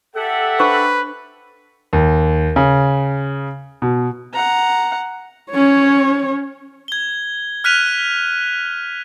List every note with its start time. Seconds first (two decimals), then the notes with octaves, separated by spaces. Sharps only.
0.16 G4 A4 E5 F#5
0.60 D4 B4 C5 C#6
1.93 D#2
2.56 C#3
3.82 B2
4.33 F#5 A#5
5.51 C#4 C#5
6.88 G#6 G7
7.64 F6 F#6 B6 D#7 F7